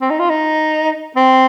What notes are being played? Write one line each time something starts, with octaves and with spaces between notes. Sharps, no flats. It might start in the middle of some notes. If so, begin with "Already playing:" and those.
C4
D#4
F4
D#4
C4